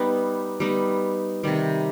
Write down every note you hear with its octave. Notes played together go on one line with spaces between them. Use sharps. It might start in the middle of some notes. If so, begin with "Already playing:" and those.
Already playing: G3 B3 D#4
G3 B3 D#4
C3 D#3 G3